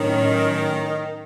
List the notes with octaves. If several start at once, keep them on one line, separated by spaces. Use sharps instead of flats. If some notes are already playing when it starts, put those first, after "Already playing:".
Already playing: A2 D#3 F#3 C#4